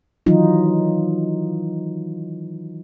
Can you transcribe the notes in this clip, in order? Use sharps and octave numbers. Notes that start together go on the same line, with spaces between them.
D#3 E3 F#3 D#4 F4